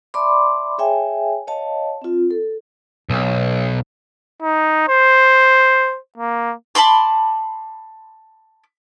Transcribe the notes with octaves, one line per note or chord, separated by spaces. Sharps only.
D5 E5 A5 B5 C6 D6
G#4 C#5 E5 G5 G#5
C#5 D#5 F5 A5
C4 F4
A4
B1
D#4
C5
A#3
A5 B5 C6 D6